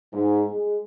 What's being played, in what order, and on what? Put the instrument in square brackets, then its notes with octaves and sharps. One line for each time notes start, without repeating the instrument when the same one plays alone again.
[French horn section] G#2
G#3